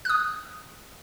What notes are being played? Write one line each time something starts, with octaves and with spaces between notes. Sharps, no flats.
D#6 F#6